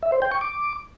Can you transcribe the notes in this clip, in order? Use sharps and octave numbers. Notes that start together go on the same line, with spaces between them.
E5
C5
G5
C#6
D6